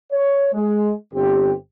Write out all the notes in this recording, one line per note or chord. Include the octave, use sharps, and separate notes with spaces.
C#5
G#3
G1 C4 G4